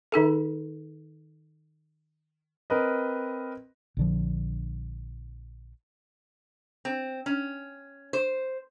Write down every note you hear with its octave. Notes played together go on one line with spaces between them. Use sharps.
D#3 D#4 G#4 A4
C4 A#4 B4 D#5
A#1 D3 F3
C4
C#4
C5